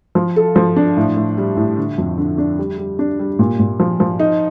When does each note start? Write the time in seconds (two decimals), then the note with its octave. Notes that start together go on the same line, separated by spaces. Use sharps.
0.15 F3
0.36 A4
0.56 F3
0.76 D4
0.97 A2
1.17 A2
1.38 G3
1.57 A2
1.78 D3
1.98 F2
2.17 D3
2.38 D4
2.59 G3
2.78 G3
2.99 D4
3.19 G3
3.39 A#2
3.60 A#2
3.80 F3
4.00 F3
4.20 D#4